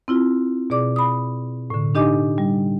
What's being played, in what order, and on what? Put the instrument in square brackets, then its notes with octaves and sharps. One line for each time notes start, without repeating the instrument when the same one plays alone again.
[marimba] C4 E4 F4
B2 G#4 D5 D6
B5 D#6
A2 D3
D4 D#4 G4 D#5 G#5 D6
G3